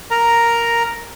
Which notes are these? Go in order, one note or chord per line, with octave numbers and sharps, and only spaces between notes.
A#4 A#5